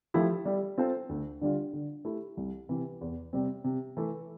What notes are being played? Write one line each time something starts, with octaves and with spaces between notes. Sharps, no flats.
F3 A3 E4 G4
G3
C4 F4 A4 C5
D2
D3 G3 D4 F4
D3
A3 E4 G4
C2
C3 E3
E2
C3 G3 C4
C3
E3 A3